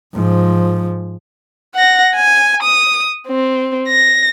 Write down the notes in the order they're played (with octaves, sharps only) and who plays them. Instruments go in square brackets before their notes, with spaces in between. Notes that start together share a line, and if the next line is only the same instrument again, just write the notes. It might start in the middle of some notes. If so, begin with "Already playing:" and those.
[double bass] G#2 F3
[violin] F#5 A#6
G#5
D#6
C4
A#6